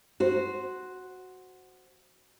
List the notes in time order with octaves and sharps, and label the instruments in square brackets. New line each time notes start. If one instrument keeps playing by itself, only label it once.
[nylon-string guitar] F#4 C5